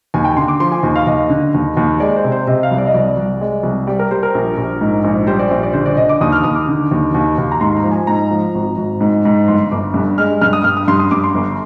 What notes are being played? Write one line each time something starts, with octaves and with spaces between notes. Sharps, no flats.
D#2 G#5
G5
D3 C6
D6
F3 C6
G#5
D#2
F5
D#2 D#5
D3
D#2
D#2
G#3 D5
C5
C3
C5
C3 D#5
F5
C2
D5
D#5
C2 D5
C2
G#3
C2
G3 D5
A#4
G3 C5
A#4
A#1
A#1
G#2
A#1
G3 C5
D5
A#1 C5
D5
D3 C5
D5
D3 D#5
D6
D#2 D#6
F6
D#2 D#6
D6
D3
D#2
D#2
D#2
A#5
G#2 C6
A#5
F3
G#5
G#2 A#5
F3
G#1
G#1
G#2
G#2
G1 C6
G1 D6
G2
G#3 F6
G2 F6
D#6
G2 F6
D#6
G2 C6
D#6
G2 D6
C6
G1